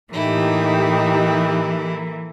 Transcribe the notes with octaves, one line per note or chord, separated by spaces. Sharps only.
A2 E3 A3 A#3 D#4 E4 G4